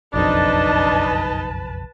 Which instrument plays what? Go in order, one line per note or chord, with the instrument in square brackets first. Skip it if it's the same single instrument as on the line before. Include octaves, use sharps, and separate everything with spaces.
[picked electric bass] F#1 B1 F2 [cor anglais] D4 [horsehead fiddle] D#4 D#5 [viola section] B4 A5